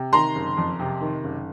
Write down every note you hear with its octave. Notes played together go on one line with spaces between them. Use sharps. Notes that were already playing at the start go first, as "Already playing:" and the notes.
Already playing: C3
D#3 A#5 C6
F#1
F2
C3
D#3
F#1